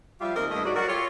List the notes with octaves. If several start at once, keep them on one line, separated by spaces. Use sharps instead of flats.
F3 G3 F4 G4 E5
D#2 C4 A#4 D#5
G2 A3 E4 D#5
G#2 F#3 G3 F#4 G4 D5
F#3 F#4 A#4 D5 F#5
F4 G4 A4 C#5